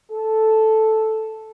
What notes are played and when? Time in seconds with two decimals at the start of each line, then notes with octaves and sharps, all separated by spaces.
0.11 A4